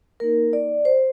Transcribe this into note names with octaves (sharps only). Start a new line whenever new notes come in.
A#3 D#4 A#4
D5
C5